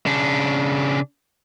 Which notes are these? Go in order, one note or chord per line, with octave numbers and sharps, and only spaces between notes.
C#3 D4